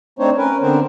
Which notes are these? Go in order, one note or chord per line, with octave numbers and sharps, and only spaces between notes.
A3 C4 D4 D#4 C5 C#5
C#4 A#4 B4
D3 B3 C4 D4 A#4 C5